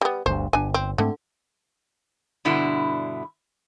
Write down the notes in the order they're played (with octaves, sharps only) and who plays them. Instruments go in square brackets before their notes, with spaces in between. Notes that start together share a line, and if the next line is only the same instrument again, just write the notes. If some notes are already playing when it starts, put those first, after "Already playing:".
[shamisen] G3 B3
[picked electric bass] G1 D2 G2 [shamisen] C5
[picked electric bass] G1 [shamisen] D4 G#5
[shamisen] C4
[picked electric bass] G#2 A3 C4 [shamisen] D3
[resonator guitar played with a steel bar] G2 B2 D3 E4